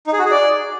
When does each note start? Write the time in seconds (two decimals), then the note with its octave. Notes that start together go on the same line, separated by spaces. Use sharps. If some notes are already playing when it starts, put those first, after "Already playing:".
0.07 D#4
0.13 G#4
0.19 F#4
0.25 G#4
0.31 D5